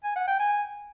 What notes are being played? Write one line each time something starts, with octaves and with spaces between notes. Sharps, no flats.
G#5
F#5
G5
G#5